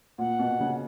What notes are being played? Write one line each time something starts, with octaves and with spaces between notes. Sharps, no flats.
A#2 F#5
B2
C#3